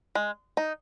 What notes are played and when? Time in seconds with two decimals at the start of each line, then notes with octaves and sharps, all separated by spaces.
0.15 G#3
0.57 D#4